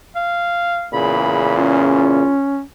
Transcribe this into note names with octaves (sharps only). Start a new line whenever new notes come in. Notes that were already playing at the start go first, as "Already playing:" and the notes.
F5
E2 A#2 C#3 B5
C#4 F4